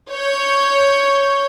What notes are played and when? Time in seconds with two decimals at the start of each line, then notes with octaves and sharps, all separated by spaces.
0.11 C#5 G6